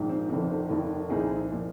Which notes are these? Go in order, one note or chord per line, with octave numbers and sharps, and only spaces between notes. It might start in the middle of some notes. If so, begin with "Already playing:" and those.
Already playing: A#1 G#2 D#3
C4
F1 F2 C3 D#3 C4
F1 D#2 D#3
C2 A#2 F3 D#4 G#4
A#2 F3